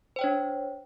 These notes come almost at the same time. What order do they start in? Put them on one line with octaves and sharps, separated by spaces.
C5 G5 C#5 D4